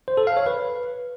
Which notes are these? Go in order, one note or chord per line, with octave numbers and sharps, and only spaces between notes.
C5
A4
F5
C#5
B4